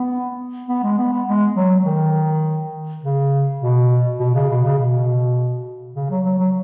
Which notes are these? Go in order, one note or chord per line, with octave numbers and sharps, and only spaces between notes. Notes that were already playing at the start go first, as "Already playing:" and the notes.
Already playing: B3
B3
G#3
B3
B3
G#3
F#3
D#3
C#3
B2
B2
C#3
B2
C#3
B2
C#3
F#3
F#3
F#3